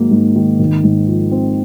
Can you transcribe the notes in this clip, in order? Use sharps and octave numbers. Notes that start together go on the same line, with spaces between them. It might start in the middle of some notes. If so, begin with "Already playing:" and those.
Already playing: G#2 D#3 F#3 A#3
G#2
D#3
G#1
G#2
F3
C4